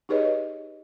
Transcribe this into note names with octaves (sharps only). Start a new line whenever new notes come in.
D#4 G4 G#4 B4 C#5 D#5